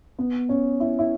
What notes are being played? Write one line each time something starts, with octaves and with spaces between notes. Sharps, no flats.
B3
C#4
E4
E4